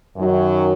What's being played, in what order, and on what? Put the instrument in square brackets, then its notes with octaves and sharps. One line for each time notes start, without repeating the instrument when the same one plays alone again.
[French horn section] F#2 D#3 F#3